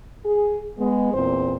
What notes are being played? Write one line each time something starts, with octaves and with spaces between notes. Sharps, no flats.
G#4
G#3 B3
E2 A#2 C4 C5